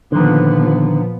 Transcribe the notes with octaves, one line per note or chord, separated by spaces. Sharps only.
A#2 D3 D#3 F3 B3